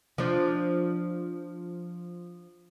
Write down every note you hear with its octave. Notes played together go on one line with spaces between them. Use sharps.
F3 D4